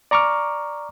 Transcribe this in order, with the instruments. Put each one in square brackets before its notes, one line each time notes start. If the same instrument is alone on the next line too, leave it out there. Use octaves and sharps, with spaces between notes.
[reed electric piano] D5 A#5 C#6 D6 F6